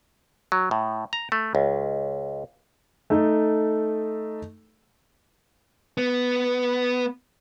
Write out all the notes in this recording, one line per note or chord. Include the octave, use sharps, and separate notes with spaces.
F#3
A2
A#5
A3
C#2
A3 D#4 A4
B3